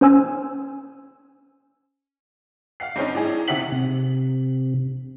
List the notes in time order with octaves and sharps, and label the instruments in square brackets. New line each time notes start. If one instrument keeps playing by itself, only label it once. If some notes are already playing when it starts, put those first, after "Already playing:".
[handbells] C#4 C5 G#5 E6
[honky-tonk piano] F5 F#5 C7
G2 C4 C#4 D#4
A2 D4 D#4 G#4
C3 D#3 E5 F#5 B6 F#7
[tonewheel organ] C3